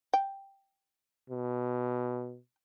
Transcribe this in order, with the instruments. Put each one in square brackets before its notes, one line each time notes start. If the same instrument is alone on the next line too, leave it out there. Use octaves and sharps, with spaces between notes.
[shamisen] G5
[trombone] B2